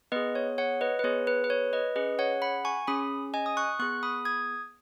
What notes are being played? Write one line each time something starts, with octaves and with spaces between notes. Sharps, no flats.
B3 G#4 B4 D#5
C#5
C#5 F#5
B4 D#5
B4
B3 G#4 C#5
B4
B4
C#5
B4 D#5
C#4 G#4 B4 D#5
C#5 F#5
F#5 B5
G#5 C#6
C#4 G#4 B5 D#6
D#5 G#5
D#6
C#6 F#6
B3 G#4 C#6 F#6
B5 D#6
D#6 G#6